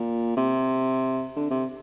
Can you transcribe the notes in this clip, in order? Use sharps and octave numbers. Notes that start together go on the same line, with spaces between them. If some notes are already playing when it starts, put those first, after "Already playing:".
Already playing: A#2
C3
D3
C3